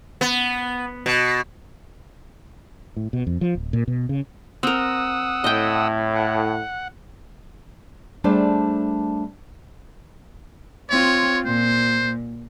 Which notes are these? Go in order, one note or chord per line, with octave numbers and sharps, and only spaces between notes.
B3
B2
A2
B2
F2
F3
D1
A#2
B2
C#3
C4 A#4 F#5 D#6 E6
A2 D#5 G5
F#5
G3 A3 D4 G#4 C5 D5
C4 F4 C#5
A#2 C5